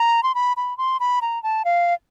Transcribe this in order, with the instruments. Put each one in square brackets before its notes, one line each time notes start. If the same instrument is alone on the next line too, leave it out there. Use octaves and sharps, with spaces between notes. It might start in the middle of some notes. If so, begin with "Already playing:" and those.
Already playing: [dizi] A#5
C6
B5
B5
C6
B5
A#5
A5
F5